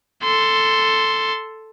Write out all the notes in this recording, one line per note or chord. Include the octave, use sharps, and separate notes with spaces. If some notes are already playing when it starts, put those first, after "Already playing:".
A4 C6